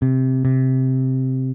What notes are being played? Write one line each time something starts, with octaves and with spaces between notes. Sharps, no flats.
C3
C3